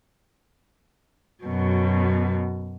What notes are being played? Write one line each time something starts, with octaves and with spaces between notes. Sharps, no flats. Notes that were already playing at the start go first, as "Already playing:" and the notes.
F#2 B2